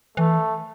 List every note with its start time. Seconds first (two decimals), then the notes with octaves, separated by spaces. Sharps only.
0.17 E3 A3